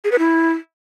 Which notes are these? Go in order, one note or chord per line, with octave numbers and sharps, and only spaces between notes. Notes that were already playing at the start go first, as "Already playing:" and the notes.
G#4
B4
E4